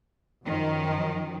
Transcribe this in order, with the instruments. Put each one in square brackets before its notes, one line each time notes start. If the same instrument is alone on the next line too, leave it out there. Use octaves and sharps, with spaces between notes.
[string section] F#2 D#3 F3